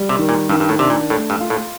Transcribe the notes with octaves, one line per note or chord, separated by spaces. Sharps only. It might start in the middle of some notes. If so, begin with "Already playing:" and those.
Already playing: G3
C3
D#3
A#2
G2 D#3
G2
A2
C3 D4
A#2
A2 A3
G2
F4
A2